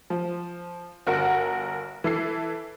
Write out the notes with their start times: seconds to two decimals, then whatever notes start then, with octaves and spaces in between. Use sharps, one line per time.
0.10 F3
1.07 G1 F#4 A#4 F#5
2.04 E3 A4 C7